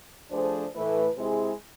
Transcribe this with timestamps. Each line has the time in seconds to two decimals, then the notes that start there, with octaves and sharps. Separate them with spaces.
0.31 F3 A3 D4 G#4 C5
0.74 A2 E3 A3 E4 B4
1.17 C3 G#3 C4 E4 G#4